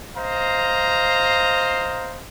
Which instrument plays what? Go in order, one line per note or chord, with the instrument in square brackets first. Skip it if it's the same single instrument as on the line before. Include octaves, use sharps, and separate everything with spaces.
[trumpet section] C5 D#5 F5 A#5